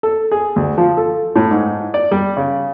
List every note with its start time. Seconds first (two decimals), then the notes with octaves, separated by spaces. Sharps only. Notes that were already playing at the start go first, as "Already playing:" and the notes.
0.03 A4
0.31 G#4
0.56 D2
0.78 F3
0.97 A4
1.36 A2
1.51 G#2
1.94 D5
2.11 G3
2.37 C#3